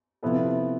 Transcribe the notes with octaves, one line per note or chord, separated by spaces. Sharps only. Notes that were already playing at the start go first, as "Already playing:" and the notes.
C3 F3 B3 E4 A4